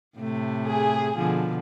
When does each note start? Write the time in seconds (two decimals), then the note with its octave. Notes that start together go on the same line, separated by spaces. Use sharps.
0.18 A2 C3 A3
0.66 G#4
1.16 B2 D3 F3